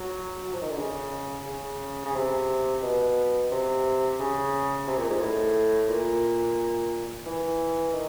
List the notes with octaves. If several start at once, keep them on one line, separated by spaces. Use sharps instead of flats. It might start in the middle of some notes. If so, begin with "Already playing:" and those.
Already playing: F#3
F#3
F3
D#3
D3
C#3
C#3
C#3
C3
B2
C3
C#3
C3
A#2
G#2
A2
A#2
E3
D#3